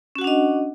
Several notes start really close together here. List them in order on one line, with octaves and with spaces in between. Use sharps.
C#4 F#4 F#5 D4 D#5